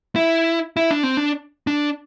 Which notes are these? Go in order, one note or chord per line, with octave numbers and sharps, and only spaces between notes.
E4
E4
D4
C4
D4
D4